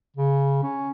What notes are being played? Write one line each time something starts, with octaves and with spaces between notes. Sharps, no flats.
C#3
C#4